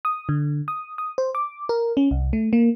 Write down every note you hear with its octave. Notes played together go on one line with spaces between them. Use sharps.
D#6
D3
D#6
D#6
C5
D6
A#4
C#4
C2
A3
A#3